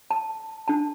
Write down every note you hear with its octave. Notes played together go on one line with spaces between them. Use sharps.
A5
D4 A5